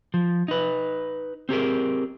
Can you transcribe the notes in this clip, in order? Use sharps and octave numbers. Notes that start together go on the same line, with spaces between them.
F3
D#4 B4
C4 G4 G#4 A#4